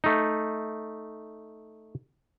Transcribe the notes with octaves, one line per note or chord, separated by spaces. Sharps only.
A3 D#4